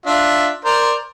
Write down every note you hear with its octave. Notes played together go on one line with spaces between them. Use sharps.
D4 F4 E5
A#4 C5 D5